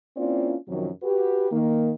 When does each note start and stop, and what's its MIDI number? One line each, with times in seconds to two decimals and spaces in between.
0.16 0.55 58
0.16 0.55 60
0.16 0.55 61
0.16 0.55 64
0.16 0.55 65
0.16 0.55 74
0.68 0.89 42
0.68 0.89 48
0.68 0.89 51
0.68 0.89 53
0.68 0.89 54
1.03 1.52 66
1.03 1.52 67
1.03 1.52 71
1.52 1.92 51
1.52 1.92 58